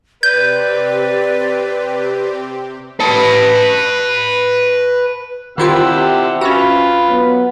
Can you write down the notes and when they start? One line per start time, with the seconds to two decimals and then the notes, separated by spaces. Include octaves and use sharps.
0.23 C3 C4 G4 B4 D5 G6
3.00 B4 A5
5.58 C3 D#3 E4 F4 G4 F#5 E6
6.41 C#4 F4 F#4 B4
7.08 F#3 B3